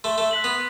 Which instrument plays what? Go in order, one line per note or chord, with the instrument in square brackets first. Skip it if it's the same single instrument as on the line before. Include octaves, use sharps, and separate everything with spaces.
[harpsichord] A3 [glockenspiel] C6
[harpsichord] A3
[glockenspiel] F#6 B6 F#7
[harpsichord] B3